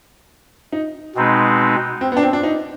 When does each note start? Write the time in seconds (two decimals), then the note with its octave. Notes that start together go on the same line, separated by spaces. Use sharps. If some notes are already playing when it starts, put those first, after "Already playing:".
0.73 D#4
1.15 B2 G#3 C4 D#4 B4
2.01 C4
2.12 B3
2.17 D4
2.23 C4
2.33 D4
2.43 D#4